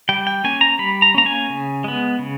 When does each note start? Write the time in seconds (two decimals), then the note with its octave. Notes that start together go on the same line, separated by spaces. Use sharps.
0.09 G3 G5
0.27 G5
0.44 A#3 C#4 G#5
0.61 A#5
0.79 G3 B5
1.02 A#5
1.14 A#3 C#4 A#5
1.26 G#5
1.50 C#3
1.84 G#3 B3
2.19 C#3